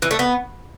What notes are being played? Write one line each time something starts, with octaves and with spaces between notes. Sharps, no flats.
E3
A3
B3